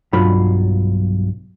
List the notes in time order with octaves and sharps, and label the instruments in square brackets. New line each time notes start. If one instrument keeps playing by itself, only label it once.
[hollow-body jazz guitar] B1 G2 F#3 F4 B5